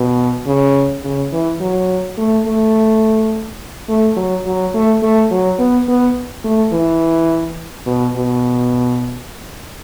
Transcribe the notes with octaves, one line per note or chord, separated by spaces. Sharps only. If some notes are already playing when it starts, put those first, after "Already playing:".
Already playing: B2
C#3
C#3
E3
F#3
A3
A3
A3
F#3
F#3
A3
A3
F#3
B3
B3
A3
E3
B2
B2